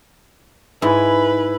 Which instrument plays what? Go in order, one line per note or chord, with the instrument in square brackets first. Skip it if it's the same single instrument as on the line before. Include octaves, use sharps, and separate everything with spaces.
[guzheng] G#2 [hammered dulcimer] E4 G#5 [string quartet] B4